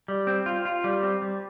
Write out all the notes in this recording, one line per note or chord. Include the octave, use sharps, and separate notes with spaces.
G3
C4
F4
F4
G3
C4
G3